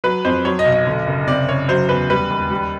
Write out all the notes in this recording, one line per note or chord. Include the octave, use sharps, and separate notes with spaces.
F#3 B4
F2 C5
F#3 C#5
D#5
B1
D#5
D3
F#1
C3 D5
F#1 C#5
F#3 C5
E2 B4
G3 B4
D#2
G3